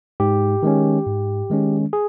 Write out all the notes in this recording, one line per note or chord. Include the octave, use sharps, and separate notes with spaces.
G#2 G4
D#3 G#3 C#4
G#2
D#3 G#3 C#4
G#4